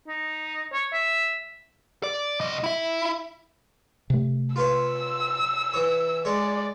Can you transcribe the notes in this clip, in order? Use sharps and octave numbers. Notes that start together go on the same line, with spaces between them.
D#4
C#5
E5
D5
C2 D#5
E4 E5
C3 A3
F4 B4 C#5 E6
E3 C#5
G#3 C#5 D5